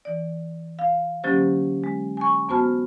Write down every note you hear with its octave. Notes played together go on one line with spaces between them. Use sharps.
E3 D5
F5
D3 F#3 A#3 C#4 G4 C5
G#3
G#5 C#6
F#2 B3 F#4 C5 A5 F6